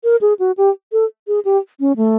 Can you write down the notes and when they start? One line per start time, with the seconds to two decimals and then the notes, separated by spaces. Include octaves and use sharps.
0.04 A#4
0.21 G#4
0.39 F#4
0.58 G4
0.92 A4
1.28 G#4
1.45 G4
1.80 C#4
1.97 A3